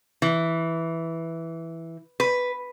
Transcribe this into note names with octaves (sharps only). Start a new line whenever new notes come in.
E3
B4